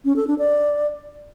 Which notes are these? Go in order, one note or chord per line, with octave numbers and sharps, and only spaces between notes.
C#4
A4
D4
D5